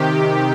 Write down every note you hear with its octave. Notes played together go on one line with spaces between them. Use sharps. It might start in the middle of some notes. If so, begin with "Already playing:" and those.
Already playing: C3 D#3 G4